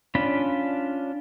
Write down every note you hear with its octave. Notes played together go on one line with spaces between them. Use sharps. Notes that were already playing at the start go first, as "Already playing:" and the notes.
C#4 D4 F4 B5